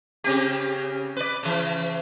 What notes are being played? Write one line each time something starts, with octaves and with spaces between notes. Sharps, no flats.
C#3 C4 G4
B4 D5
C#3 E3